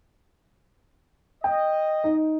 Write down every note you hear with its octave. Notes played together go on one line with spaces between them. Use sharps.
D#5 G5
D#4